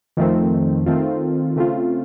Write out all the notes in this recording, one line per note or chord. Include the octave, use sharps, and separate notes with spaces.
F2 D#3 A3 C4
D#3 A3 C4 F4
C#3 A3 C4 F4